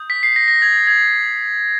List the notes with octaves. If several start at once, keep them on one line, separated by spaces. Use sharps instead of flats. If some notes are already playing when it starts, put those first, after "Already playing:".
Already playing: D#6 G6
B6
C7
A#6
A#6
G#6
G#6